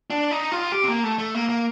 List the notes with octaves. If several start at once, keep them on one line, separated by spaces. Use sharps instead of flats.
D4
D#4
F4
G4
C4
A#3
A3
A3
A#3
A#3